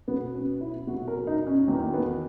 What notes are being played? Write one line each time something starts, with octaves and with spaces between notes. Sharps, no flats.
B2 F#3 B3
C#4
E4
B2 F#3 F#4
A#4
D#4
C#4
E2 D#3 F#3 A#3
B3